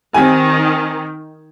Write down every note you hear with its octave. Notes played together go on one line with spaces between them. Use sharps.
D#3 C4 G4 G#5